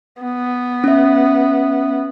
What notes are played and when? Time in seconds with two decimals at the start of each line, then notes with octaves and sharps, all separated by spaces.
0.22 B3
0.84 C#4 E5